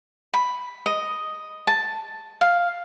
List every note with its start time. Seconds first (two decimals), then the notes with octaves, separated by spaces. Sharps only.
0.34 B5
0.86 D#5
1.67 A5
2.41 F5